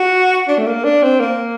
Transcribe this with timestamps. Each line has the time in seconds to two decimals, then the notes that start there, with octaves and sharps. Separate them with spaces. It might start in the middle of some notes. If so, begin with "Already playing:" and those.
Already playing: F#4
0.48 D4
0.58 A3
0.66 A#3
0.84 D4
1.03 C4
1.20 A#3